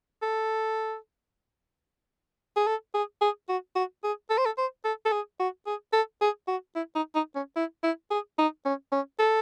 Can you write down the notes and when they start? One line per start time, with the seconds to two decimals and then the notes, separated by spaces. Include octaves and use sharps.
0.22 A4
2.57 G#4
2.67 A4
2.94 G#4
3.21 G#4
3.49 F#4
3.76 F#4
4.04 G#4
4.30 A4
4.38 C5
4.46 A4
4.58 C5
4.85 A4
5.05 A4
5.12 G#4
5.40 F#4
5.67 G#4
5.93 A4
6.21 G#4
6.48 F#4
6.75 E4
6.95 D#4
7.15 D#4
7.36 C#4
7.56 E4
7.83 E4
8.11 G#4
8.38 D#4
8.65 C#4
8.92 C#4
9.19 A4